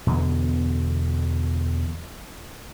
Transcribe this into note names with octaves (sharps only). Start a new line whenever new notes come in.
E2 B2 D3 B3